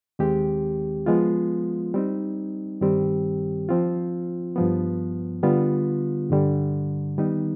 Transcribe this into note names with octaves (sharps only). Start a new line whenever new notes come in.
D#2 D#3 G#3 C4 G4
F3 G#3 B3 F4
G3 C4 D#4
G2 D#3 G3 C4 G4
F3 C4 F4
G2 F3 B3
D3 G3 B3 F4
G2 D3 G3
D#3 G3 B3 D#4